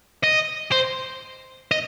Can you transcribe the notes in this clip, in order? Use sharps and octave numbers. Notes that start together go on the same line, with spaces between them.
D#5
C5
D#5